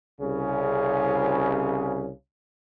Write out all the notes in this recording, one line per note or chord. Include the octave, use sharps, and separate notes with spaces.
C2 C#3